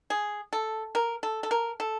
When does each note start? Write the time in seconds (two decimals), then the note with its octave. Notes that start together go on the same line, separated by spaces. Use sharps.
0.10 G#4
0.53 A4
0.95 A#4
1.23 A4
1.43 A4
1.51 A#4
1.80 A4